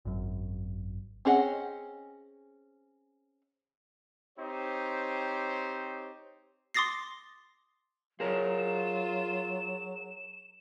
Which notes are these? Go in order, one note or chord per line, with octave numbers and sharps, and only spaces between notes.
G#1 F#2
C4 C#4 G#4 D#5 F#5
C4 D#4 G4 C5 C#5
C6 D6 D#6 A6 A#6 C7
F#3 F4 G#4 A#4 C#5 E7